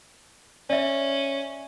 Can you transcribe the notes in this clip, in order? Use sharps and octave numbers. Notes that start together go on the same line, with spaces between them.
C#4 D5 E5